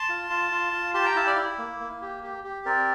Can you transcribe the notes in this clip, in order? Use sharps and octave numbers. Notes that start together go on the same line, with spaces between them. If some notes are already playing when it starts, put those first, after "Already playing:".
Already playing: A5 C6
F4
F4
F4
F4
G4 A5 C6
G5 A#5
E4 F5 A5
D5 F5
E4
A#3
A#3
G4
G4
G4
C4 A#4 D5